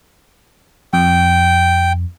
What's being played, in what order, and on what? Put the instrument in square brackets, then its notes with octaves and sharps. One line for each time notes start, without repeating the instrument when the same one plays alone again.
[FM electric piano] F2 [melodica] G5